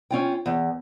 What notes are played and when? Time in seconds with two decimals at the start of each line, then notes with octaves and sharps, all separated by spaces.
0.11 C#4 F4 G5
0.46 E2